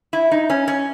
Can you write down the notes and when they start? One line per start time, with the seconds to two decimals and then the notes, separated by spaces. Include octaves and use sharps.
0.13 E4
0.31 D#4
0.50 C#4
0.68 C#4